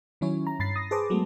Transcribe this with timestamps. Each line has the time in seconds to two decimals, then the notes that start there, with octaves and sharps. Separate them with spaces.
0.21 D#3 F#3 C#4 E4 C#5
0.47 A#5
0.59 G2 B5 A6 C7
0.76 D#6 A#6 C7
0.91 G#4 B4 C5 A5 D6
1.10 F#3 G#3 A3 B3